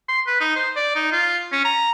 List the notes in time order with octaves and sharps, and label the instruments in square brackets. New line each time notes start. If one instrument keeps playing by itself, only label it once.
[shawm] C6
B4
D#4
C5
D5
D#4
F4
C#4
A#5